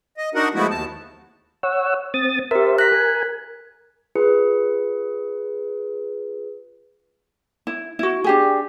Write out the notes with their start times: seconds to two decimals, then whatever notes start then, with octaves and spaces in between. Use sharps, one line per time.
0.17 D#5
0.35 D4 D#4 F#4 A#4 F#5
0.54 F3 G#3 A3 B3 E4 F#4
0.71 D#2 A5
1.63 C#5 F#5 E6
2.14 C4 D#6 A6
2.51 G4 A#4 C5 E5
2.78 A#5 F#6 B6
2.92 A#4 G#5
4.15 F4 G#4 B4 C#7
7.67 E4
7.99 E4 F#4
8.24 D4 G4 G#4